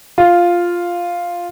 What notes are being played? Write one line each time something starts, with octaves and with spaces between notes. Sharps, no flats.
F4